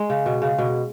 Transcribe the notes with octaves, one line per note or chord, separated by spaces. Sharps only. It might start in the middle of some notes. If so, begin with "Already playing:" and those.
Already playing: G#3
C#3
B2
C#3
B2